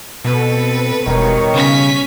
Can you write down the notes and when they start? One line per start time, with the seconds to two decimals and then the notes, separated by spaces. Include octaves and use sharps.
0.25 B2 B3 C4 A4 B4
1.06 E1 B2 D#3 G3 C#5
1.54 C#3 C#4 B6